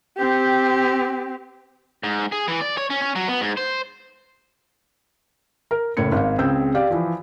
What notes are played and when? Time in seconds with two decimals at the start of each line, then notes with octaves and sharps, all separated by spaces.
0.18 C4 G4
2.03 G#2
2.32 G#4
2.48 E3
2.61 D5
2.77 C#5
2.90 C#4
3.02 C#4
3.16 F#3
3.28 B3
3.41 G#2
3.57 C5
5.71 A#4
5.97 F#1 A2 G#6 C#7
6.12 G#1 F5
6.38 C#2 C4 G#4 E6 G6
6.75 G4 D5 F5
6.90 E3 F3